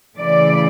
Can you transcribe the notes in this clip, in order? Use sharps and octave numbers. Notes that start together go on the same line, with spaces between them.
C#3 E3 A3 D5